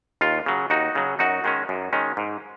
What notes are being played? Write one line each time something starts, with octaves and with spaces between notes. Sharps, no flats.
D#2 F4
C#3 F#3
D#2 D#4 F#4
C#3 F#3
F#2 D#4 F#4
D#3 G#3 C#4
F#2
D#3 G#3 C#4
G#2